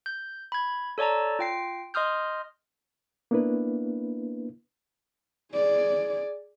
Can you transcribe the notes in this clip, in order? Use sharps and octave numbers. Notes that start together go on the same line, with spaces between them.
G6
B5 G#6
A4 C#5 D5 A5 A#5
F4 G5 C7
D#5 C6 D#6 F6 G6
A#3 B3 D4 E4 B4
G#4 D5